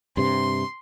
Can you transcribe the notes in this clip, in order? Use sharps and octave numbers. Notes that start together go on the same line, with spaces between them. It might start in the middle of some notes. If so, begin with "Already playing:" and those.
G2 C3 C6